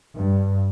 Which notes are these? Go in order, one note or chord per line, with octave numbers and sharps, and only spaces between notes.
G2